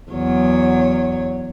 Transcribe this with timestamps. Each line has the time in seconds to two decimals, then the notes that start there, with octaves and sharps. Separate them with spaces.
0.11 E2 F#3 C#5